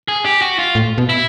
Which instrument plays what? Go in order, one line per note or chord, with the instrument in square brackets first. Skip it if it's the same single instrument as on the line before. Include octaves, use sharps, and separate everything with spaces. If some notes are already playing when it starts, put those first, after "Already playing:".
[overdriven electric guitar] G#4
G4
F#4
F4
[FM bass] A2
B2
[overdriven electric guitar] E4